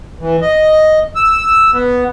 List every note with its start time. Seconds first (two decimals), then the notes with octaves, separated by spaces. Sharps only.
0.20 E3
0.41 D#5
1.16 E6
1.73 B3